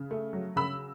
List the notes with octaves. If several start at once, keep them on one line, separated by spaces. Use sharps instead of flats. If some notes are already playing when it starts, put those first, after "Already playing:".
Already playing: C#3
A3
F#3
C#3 B5 E6